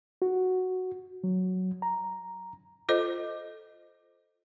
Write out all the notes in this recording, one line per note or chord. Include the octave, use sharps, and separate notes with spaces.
F#4
F#3
A#5
F4 A4 C5 D#5